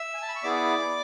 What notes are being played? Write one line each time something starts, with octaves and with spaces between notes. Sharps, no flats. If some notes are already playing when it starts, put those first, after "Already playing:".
Already playing: E5 E6
G#5
A5
B5
C#6
B3 E4 G#4 D5 D6